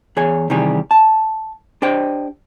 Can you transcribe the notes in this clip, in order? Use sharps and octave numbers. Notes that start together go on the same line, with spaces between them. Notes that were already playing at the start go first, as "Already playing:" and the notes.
E2 G#4 C#5 G#5
C3 D#3 E3 G3 G4 G#4
A5
D4 G4 C5 D#5 G5